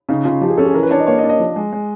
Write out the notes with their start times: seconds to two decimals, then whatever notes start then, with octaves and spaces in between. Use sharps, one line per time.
0.09 C#3 D#4
0.25 C#3 F4
0.41 F3 G4
0.50 G#4
0.58 C#4 A4
0.66 G#4
0.74 E3 A#4
0.83 B4
0.91 D4 C#5
0.99 D#5
1.07 A#3 C#5
1.18 D#5
1.23 D4
1.29 D#5
1.40 F3
1.56 G#3
1.72 G#3